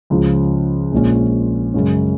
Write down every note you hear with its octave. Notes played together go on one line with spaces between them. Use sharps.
C#2 C#3 F3
A#1 A#2 G#3 C#4
F#2 C#3 G#3 C#4